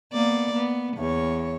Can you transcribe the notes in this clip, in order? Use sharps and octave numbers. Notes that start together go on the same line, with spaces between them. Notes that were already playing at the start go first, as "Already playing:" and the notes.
A#3 B3 D5
B3
E2 C#5